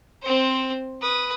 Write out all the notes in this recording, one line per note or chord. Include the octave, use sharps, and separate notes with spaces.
C4 C5
B4 D#6